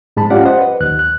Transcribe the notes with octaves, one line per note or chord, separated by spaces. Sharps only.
G#2 G#3 A5 B5
C#4 F4 G4 D5 F5 F#5
C5 D#5 F#5
B4
D#2 F#6
F#6